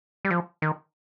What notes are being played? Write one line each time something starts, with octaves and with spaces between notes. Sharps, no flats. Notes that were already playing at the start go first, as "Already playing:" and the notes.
G3
F3
D#3